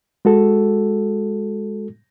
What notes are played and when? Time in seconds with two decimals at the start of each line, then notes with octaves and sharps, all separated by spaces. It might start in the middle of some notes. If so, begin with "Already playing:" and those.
0.25 G#3 F#4 A4